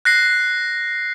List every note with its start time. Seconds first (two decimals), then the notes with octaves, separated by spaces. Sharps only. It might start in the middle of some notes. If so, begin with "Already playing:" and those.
0.05 F#6 A#6 C7